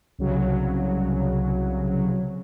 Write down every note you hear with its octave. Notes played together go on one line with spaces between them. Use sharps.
C2 C#3 F#3